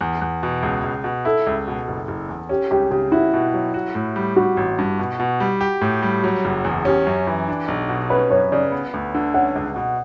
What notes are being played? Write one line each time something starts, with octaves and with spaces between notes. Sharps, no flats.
E2
E2
B2
C#2
C#2
B2
E4 A4
C#2
B2
F#1
F#1
E2
C#4 G4
C#2 G4
C#3 G4
E4 F#4
B2
F#3
F#4
A2
G3
G3 F#4
A1
G2
B2
B2
G3
G4
A2
G3
F#3
F#1
E2
C#4 G4
F#2
E3
D4
B1
B2
C#4 B4
F#2 C#5
C#3 D5
B3
D2
D3
C#4 F#5
C#2
B2